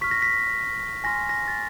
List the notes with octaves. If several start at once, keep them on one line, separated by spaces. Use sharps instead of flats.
C#6 F6 B6
A#6
B6
G#5 C6 F6 A#6
A#6
A6